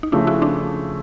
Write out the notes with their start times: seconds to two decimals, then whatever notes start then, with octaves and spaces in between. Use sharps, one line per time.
0.03 D#4
0.12 C#3 F3 A3 D4 E4
0.27 E4 F#4
0.42 C4 D4